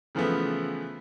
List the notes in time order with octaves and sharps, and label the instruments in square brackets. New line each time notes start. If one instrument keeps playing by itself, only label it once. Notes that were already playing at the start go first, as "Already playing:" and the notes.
[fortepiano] C#3 E3 F3 A3 B3